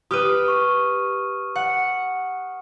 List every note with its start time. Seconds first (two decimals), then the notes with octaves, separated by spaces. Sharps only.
0.11 G4 B4 D#6 F6 D#7
0.48 C#6
1.55 F#5